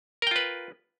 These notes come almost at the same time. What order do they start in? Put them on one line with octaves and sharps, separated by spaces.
A#4 G5 F4 B4